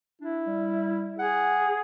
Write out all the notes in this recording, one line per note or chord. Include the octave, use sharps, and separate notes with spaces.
D4 E4
G3
G#4 F#5